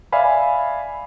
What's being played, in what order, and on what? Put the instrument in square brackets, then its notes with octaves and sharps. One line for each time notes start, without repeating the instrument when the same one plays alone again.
[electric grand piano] D5 E5 F5 G#5 B5